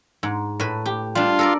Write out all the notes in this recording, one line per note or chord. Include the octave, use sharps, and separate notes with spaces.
G#2
A2 B4
G4
G3 D4 F4
A4 A#4 D5